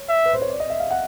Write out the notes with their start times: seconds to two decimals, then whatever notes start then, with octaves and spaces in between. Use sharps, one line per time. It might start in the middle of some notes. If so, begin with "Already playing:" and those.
Already playing: C#5
0.09 E5
0.26 B4
0.34 C5
0.42 C#5
0.50 D5
0.60 D#5
0.70 E5
0.80 F5
0.91 F#5